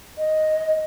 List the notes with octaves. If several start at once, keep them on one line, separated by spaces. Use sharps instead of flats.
D#5